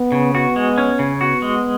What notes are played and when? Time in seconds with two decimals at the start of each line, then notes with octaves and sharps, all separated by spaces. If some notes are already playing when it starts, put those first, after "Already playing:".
Already playing: B3
0.12 C#3
0.35 B3 F#4
0.56 G#3
0.78 C#4
0.99 C#3
1.21 B3 F#4
1.42 G#3